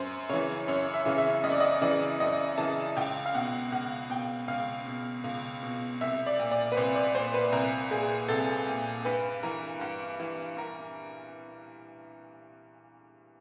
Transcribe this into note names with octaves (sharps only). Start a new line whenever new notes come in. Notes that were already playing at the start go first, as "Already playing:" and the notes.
Already playing: F#2 C5
C#3 E3 C#5
F#2 C#5
E5
C#3 E3
E5
F#2 D#5
D5
D#5
C#3 E3 D5
F#2 D#5
C#3 E3 A5
C#2 G5
F5
B2 F#5
C#2 F#5
B2 G5
C#2 F5
B2
C#2
B2
C2 E5
D5
A#2
D5
B4
C2 C5
D5
A#2 C5
B4
C2 A#4
A#2 G#4
C2 A4
A#2
G2 B4
E3 A#4
G2
E3
G2 A#4